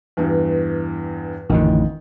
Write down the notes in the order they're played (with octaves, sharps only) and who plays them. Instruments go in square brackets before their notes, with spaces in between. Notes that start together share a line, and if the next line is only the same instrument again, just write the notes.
[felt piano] E2 G2 E3
[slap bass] A1 F2 D3 [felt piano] D#3